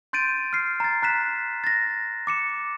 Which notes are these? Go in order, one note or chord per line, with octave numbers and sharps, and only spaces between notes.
C6 G6 A6 D7 D#7
F6 C7
A#5 A6
A#5 F#6 B6 E7
A6 A#6
D6 C#7 E7